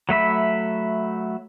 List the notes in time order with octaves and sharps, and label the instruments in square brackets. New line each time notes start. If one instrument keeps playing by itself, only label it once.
[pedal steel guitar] F#3 A3 E5 B5